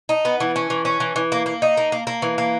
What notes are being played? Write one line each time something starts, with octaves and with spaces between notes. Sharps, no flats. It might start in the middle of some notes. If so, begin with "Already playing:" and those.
D#4
B3
E3
C#4
E3
C#4
E3
E3
A#3
A#3
D#4
A#3
A#3
A#3
E3
A#3